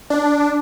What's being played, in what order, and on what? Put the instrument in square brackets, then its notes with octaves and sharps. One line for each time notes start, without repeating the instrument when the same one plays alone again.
[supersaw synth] D4